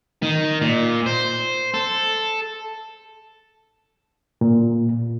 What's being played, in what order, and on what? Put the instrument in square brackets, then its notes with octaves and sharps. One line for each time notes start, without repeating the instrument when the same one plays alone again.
[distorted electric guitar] D#3
A#2
C5
A4
[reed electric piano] A#2